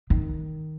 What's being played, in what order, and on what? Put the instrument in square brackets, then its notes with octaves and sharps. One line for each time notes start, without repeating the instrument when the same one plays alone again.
[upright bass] D#3